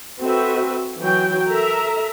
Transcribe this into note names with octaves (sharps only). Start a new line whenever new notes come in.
C4 F#4 A4 B4 E5
E3 F#3 F#4 G5
A4 A#4 E5 A#5